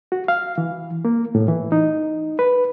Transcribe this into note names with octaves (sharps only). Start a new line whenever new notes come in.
F#4
F5
E3
A#3
A2
E3
D#4
B4